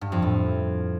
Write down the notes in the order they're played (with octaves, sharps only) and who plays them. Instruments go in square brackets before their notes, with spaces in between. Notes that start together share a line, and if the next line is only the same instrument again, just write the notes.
[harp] G2
F2
A2